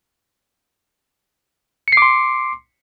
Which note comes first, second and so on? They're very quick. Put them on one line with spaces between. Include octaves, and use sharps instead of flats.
C#7 C7 D6 C6